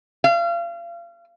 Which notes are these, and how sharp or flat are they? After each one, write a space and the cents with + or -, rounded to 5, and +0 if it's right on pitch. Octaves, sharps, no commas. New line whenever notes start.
F5 -35